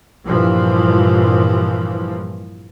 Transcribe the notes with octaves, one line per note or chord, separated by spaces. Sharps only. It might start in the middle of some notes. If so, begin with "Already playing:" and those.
G2 A#2 E3 F3